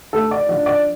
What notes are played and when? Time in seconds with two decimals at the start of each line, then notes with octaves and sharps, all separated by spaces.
0.13 D2 A4
0.31 D5
0.49 D3 F3 D5
0.66 D5